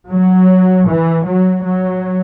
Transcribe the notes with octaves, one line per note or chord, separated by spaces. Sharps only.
F#3
E3
F#3
F#3